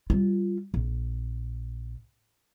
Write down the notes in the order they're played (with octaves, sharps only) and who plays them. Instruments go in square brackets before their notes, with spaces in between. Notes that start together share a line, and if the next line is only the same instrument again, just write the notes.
[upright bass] G3 F4
A#1